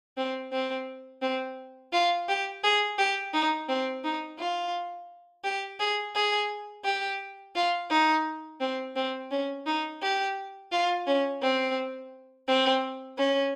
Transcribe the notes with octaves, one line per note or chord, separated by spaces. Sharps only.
C4
C4
C4
F4
G4
G#4
G4
D#4
C4
D#4
F4
G4
G#4
G#4
G4
F4
D#4
C4
C4
C#4
D#4
G4
F4
C#4
C4
C4
C#4